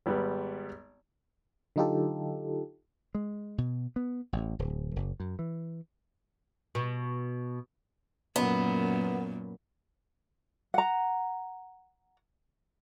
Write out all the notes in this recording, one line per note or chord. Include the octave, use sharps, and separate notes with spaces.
G#1 G3 B3
D3 F#3 D#4 F4 G4 A4
G#3
B2
B3
A1
D1
F#1
F#2
E3
B2
F#2 A#2 B3
F#5 A#5